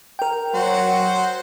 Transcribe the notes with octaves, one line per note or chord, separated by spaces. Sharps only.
A#4 G5
F#3 F#4 C5